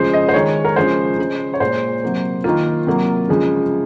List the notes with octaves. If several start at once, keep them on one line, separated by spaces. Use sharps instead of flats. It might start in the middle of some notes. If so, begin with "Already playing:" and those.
Already playing: C#3 F3 G#3 C5
D#5
C5
D#3 G#3 C#5
A#4
C#3 F3 G#3 C5
C#3 G#3
C#5
A#2 G#3 C5
C3 F#3 A#3
D#3 A#3 F4
C3 F#3 A#3
C#3 F3 G#3